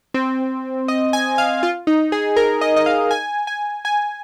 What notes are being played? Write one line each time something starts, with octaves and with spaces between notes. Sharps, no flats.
C4
D#5
G#5
F5
F4
D#4
G#4
A#4
D#5
D#5
F5
G#5
G#5
G#5